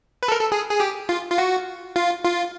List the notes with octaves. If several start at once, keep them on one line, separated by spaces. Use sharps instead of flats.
B4
A4
A#4
A4
G#4
G#4
G4
F4
F4
F#4
F4
F4